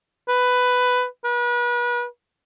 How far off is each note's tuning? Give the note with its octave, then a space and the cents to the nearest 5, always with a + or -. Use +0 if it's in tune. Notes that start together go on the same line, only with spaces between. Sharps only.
B4 +10
B4 -35